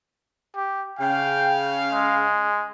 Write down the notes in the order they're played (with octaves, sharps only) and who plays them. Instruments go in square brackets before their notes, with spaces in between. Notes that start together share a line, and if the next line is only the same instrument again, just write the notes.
[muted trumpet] G4
[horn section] C#3 F5 [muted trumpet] G5
[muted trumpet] G#3